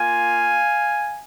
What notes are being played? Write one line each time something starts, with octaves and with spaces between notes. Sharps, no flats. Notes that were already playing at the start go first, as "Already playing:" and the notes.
Already playing: A#3 F4 F5 G#5